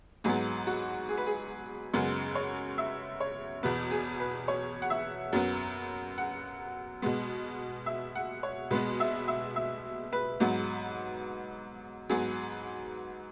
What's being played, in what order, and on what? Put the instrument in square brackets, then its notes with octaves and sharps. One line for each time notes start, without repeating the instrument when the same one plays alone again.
[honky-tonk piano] G#2 F#3 B3 G#4
F#4
G#4
B4
G#4
F#2 C#3 G#3 B3 G#4
C#5
E5
C#5
E2 B2 B3 B4
G#4
B4
C#5
F#5
E5
F#2 F#3 B3
F#5
B2 G#3 B3
E5
F#5
C#5
B2 G#3 B3 B4
E5
E5
E5
B4
G#2 F#3 B3
G#2 F#3 B3 G#4